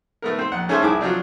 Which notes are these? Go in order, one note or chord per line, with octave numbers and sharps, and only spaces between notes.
A3 B3 A#4
C4 C5
A#1 F#5
A3 C#4 G#4 A4 C5 E5
C2 E4 G#4 A5 D6
F3 F#3 C4 D4